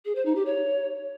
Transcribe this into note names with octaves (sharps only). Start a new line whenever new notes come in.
G#4
C5
D#4
G4
C#5